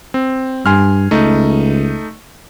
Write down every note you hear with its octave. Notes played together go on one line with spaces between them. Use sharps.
C4
G2 G#5 C6 F6
C#2 A3 D#4